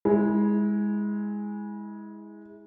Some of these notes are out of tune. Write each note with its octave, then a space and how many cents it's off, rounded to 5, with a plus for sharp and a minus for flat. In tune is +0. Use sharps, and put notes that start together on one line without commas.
G#3 -5 E4 -30